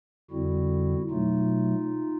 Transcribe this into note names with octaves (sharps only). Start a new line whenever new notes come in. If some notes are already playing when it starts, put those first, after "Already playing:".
F2 D3 G3 C4 E4 F#4
B2 F#3 A3 D#4 F4